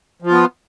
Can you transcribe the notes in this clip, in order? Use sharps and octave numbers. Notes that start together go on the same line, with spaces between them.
F3 B3 F4